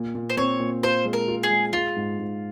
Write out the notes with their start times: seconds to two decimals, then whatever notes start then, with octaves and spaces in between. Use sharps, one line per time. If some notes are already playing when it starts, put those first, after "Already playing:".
Already playing: A#2
0.15 A#2
0.30 C5
0.37 C4 C#5
0.59 A#2
0.83 F4 C5
1.05 G#3
1.13 A#4
1.28 F4
1.43 G#4
1.50 G#3
1.73 G#3 F4
1.96 G#2
2.19 G#2